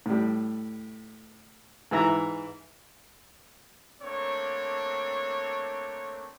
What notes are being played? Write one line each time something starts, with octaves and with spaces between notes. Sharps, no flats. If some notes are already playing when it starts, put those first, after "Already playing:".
A2 G3
G#2 E3 E4 A#5
A3 A#3 C4 D4 C#5 C#6